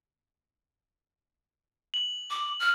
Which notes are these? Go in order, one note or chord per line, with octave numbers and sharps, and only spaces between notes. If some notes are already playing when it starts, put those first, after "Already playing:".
F#7
D6
F6